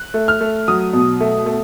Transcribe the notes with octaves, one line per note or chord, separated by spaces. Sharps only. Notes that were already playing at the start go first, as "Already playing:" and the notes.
Already playing: F#6
A3
F6
A3
F#3 D#6
B2
A3
A3